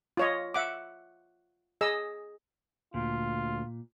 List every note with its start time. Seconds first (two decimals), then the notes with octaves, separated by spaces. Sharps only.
0.17 F4 C#5 D#5
0.54 E5 F#5 D6
1.81 G#4 D#5 E6
2.94 D2 A#2 F4